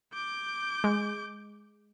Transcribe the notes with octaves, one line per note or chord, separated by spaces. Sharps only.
D6 G6
G#3